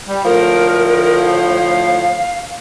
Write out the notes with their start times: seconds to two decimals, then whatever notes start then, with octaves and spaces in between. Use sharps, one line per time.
0.09 G3
0.25 D2 A2 F3 A#4
1.26 F5